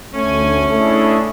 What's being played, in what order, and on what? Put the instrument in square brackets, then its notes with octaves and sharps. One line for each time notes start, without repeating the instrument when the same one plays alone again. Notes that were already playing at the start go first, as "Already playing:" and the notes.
[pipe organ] D2 G#5 [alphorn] A3 [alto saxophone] C#4
[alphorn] A3 [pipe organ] D4 E4 G#4